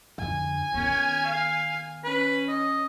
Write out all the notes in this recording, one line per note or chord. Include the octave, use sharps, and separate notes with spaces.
F2 D3 G#5
D#3 B3 C#4
F5
C#4 B4
D#5